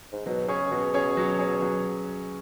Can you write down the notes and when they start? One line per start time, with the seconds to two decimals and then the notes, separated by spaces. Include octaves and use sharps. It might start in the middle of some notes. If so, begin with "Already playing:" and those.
0.12 G#2
0.26 B2 F#3
0.48 C#3 C#4 G#4 C#5
0.71 B2 F#3
0.94 C#4 G#4 C#5
1.17 F#3
1.38 C#4 G#4 C#5
1.62 F#3